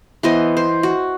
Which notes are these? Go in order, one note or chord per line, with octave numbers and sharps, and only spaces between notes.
E3 B3 C5 D#5
C5
F#4